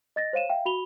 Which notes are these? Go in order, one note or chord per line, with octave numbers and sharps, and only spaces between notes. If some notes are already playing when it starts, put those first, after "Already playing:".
D#5 A6 A#6
C5 C#5 F5 D#7 E7
E5 F5 G5
F#4 B5 F7 G7